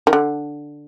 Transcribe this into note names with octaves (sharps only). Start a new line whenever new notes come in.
D#3
D3